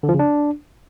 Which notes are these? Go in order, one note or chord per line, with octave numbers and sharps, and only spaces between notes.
D3
F3
C#3
D4